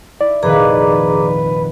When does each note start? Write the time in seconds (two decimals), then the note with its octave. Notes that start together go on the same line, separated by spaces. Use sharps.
0.21 E4 D5
0.42 F1 A#2 D#3 G#4 B4 A#5 D6